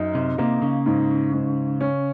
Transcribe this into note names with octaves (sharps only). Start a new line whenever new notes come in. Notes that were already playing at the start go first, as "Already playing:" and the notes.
Already playing: F#2 D#4
C3
C3 A#3
C#3
G#2
G#2
C#4